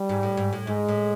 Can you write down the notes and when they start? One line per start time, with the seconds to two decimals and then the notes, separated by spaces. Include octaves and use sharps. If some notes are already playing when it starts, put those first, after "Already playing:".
Already playing: G3
0.09 G#2
0.23 A2
0.37 G#2
0.53 A2
0.67 G#2 G#3
0.88 A2